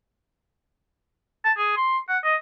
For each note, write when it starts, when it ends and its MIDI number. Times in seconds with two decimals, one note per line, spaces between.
1.45 1.53 81
1.57 1.75 68
1.77 1.98 84
2.09 2.18 78
2.23 2.35 75